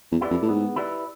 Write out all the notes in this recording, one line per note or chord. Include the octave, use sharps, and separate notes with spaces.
E2
E4 G4 B4 D5
F2
A2
G#2 B3
E4 G4 B4 D5